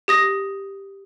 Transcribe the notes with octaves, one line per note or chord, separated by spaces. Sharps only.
G4 D#6 A#6